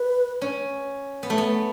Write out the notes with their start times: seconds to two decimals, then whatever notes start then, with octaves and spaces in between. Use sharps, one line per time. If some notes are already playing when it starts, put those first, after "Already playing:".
Already playing: B4
0.41 C#4
1.23 B3
1.30 A3
1.38 B3